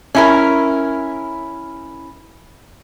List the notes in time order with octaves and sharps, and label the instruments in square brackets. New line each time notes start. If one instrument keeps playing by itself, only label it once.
[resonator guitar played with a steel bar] C#4 E4 A#4